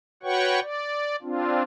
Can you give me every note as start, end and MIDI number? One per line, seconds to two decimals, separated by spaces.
0.23 0.60 66
0.23 0.60 71
0.23 0.60 73
0.23 0.60 78
0.23 0.60 79
0.23 0.60 85
0.61 1.16 74
1.22 1.63 60
1.22 1.63 62
1.22 1.63 65